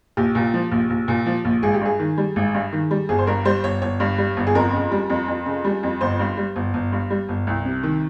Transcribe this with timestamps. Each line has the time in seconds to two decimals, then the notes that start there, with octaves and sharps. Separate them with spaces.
0.17 A#1 G4
0.35 A#2
0.54 F3
0.72 A#1
0.90 A#1
1.08 A#2
1.26 F3
1.45 A#1
1.63 G#1 G#4
1.74 G4
1.81 G2 G#4
1.99 D#3
2.18 G3
2.36 G#1
2.54 G2
2.72 D#3
2.91 G3
3.09 G1 G#4
3.19 C5
3.27 G2 A#4
3.45 G3 C5
3.64 G1 C#5
3.82 G1 C#5
4.00 G2
4.18 G3
4.37 G1
4.47 G#4
4.55 F2 A#4
4.73 C#3
4.92 G3
5.10 F2
5.28 F2
5.46 C#3
5.65 G3
5.83 F2
6.01 G1 C5
6.19 G2
6.37 G3
6.56 G1
6.74 G1
6.92 G2
7.10 G3
7.29 G1
7.47 C2
7.65 C3
7.83 D#3